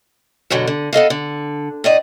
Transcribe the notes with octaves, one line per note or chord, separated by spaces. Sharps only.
F#2 B2 D3 F#3
D3
B3 A4 D#5 F5
D3
A2 D5 D#5